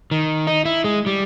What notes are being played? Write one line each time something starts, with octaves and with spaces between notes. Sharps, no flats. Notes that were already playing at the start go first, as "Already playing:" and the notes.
D#3
D#4
E4
G#3
G3